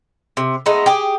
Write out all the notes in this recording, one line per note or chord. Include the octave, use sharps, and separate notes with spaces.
C3
G#3 A3 B3 D#4
G4 G#4